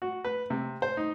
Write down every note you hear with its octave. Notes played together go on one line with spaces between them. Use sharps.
F#4
B4
C3
C5
D#4